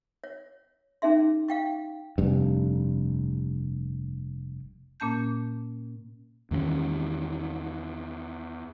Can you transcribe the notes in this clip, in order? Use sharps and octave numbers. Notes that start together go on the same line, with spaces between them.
C#5
C#4 D#4 G#4 E5 C6
F5 G5 C#6
F1 G2
A#2 A#3 C#4 A5 G6
E2 D#3 A#3 C#4